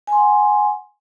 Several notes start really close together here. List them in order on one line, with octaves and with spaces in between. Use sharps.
G#5 C6 F#5